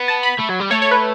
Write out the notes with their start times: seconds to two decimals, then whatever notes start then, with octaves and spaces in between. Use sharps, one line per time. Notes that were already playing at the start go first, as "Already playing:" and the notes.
Already playing: B3
0.08 A5
0.23 B5
0.39 A3
0.50 F#3
0.60 G3
0.71 A3 C#5
0.82 C#5
0.91 B4